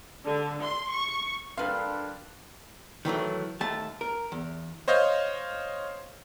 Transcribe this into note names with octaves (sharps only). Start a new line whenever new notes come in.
D3
C6
C#6
G2 A#2 D4 A4 B4 F5 B5 C6
D#3 E3 F#3 A3
D#2 A3 A5
A#4
E2
C5 C#5 D#5 F5 G6